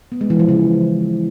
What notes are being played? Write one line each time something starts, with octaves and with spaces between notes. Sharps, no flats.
B3
G#3
E3
F3
C#3